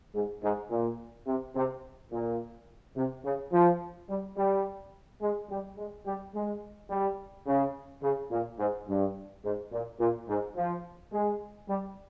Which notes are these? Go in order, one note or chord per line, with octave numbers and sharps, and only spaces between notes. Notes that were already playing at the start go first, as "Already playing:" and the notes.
G#2
G#2
A#2
C3
C3
A#2
C3
C#3
F3
G3
G3
G#3
G3
G#3
G3
G#3
G3
C#3
C#3
A#2
G#2
G2
G#2
A#2
A#2
G#2
F3
G#3
G3